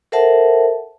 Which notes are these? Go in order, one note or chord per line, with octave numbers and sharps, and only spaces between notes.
A4 A#4 C5 E5 F#5 A5